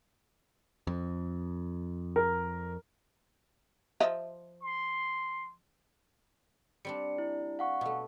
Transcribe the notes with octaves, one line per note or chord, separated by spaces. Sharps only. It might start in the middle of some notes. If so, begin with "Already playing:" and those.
F2
A#4
F3 D#5 E5
C6
G3 C4 D4 C#7
E4
F5 F#5 C#6
B2 A3